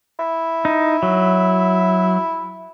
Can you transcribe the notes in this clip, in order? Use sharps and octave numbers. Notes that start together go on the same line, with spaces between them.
E4
D#4
F#3